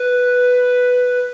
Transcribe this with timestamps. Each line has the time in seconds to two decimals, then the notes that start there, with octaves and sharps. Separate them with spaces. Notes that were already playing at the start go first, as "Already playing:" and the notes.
Already playing: B4